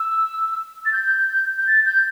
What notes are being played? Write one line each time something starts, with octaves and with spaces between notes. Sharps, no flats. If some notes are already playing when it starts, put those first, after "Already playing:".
Already playing: E6
A6
G6
G6
A6
G6